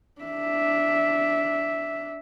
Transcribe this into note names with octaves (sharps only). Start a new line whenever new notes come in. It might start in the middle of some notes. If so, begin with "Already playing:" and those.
D4 E5